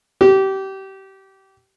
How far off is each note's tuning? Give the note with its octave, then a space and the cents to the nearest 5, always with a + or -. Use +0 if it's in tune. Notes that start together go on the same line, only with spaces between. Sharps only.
G4 -25